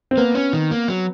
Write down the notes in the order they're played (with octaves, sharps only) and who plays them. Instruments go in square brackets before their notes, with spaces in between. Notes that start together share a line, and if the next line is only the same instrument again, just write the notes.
[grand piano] C4
[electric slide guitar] A#3 [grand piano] B3
[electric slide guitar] C#4
D#3
A#3
F#3